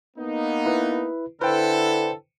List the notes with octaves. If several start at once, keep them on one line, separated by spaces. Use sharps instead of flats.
A#3 B3 D#4
E4 B4
D3 E4 A4 B4 C5 G5